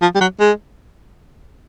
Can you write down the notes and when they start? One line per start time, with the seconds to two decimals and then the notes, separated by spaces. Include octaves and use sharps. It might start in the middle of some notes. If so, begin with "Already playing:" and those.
0.02 F3
0.15 G3
0.21 F#3
0.40 G#3